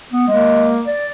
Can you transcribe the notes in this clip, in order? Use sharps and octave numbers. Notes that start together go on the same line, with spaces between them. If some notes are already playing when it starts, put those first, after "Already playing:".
B3
G#3 A#3
D5